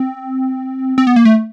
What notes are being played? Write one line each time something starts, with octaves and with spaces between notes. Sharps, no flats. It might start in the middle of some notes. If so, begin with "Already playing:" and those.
Already playing: C4
C4
B3
A#3
A3